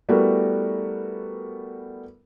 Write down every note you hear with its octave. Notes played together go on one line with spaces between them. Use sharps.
G3 A3 B3 E4 F#4 A#4